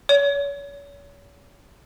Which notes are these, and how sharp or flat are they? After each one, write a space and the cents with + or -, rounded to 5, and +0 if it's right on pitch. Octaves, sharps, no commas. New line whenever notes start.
C#5 +35